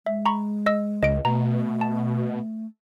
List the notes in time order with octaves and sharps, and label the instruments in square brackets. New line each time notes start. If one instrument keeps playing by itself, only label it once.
[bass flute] G#3 [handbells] E5
[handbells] A#5 B5 C#6
D#5 E6
[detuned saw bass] C#2 [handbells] D#5 D7
[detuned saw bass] B2 [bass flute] A3 [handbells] A#5
[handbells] A5